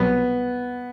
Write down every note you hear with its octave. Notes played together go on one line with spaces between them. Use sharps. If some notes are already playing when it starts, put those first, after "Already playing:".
Already playing: C2 B2 F#3 B3 C4